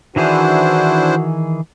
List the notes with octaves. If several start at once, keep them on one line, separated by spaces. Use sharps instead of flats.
D#3 E3 D4 E4 F#4 G#4 C5